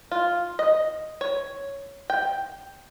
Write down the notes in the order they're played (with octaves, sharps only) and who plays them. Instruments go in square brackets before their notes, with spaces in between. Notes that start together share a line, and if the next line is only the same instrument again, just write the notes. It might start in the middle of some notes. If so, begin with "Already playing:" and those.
[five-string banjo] F4
D#5
C#5
G5